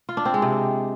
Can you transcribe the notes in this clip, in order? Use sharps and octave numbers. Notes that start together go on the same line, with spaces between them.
F4
D4
C4
G#3
C3